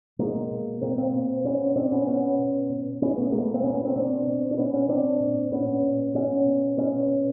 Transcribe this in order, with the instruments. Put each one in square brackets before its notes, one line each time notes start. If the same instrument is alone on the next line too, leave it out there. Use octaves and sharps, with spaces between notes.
[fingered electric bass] B2 G#3 A#3
B2
B2 A#3 C4
A#3 C4
B2
B2 B3 C#4
B2 C4 D4
B3 C#4
B2 B3 C#4
B2
B2
B2 B3 C#4
A3 B3
B2 G#3 A#3
A3 B3
A#3 C4
B2 B3 C#4
B3 C#4
A#3 C4
B2 C4 D4
B2
D4
B2 B3 C#4
B3 C#4
B2 C4 D4
A#2
A#2 B3 C#4
A#2
A#2 B3 C#4
B2
B2 B3 C#4
B2